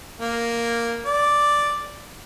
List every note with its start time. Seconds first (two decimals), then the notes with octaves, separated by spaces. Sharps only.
0.20 A#3
1.05 D5